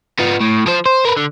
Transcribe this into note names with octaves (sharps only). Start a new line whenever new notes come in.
B3 F4
A2
F3 C5
C5
A#4 B4
D3